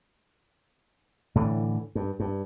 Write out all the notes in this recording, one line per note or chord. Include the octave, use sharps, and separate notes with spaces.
A2 D3 E3
G2
G2